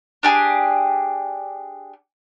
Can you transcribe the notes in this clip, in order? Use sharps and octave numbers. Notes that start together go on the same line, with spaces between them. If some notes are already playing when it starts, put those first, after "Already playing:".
D4 G4 G#4